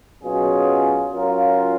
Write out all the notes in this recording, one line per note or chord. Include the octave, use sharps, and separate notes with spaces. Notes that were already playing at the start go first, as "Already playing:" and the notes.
B2 F#3 C#4 F4 G#4
F#3 C#4 F4 A#4